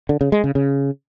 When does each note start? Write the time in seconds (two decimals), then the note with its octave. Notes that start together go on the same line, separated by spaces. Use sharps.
0.09 D3
0.21 C#3
0.32 G#3
0.44 C#3
0.55 C#3